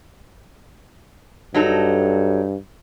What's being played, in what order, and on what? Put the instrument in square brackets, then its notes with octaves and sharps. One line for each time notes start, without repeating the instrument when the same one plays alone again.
[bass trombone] G2 [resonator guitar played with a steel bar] F#3 D#4 A4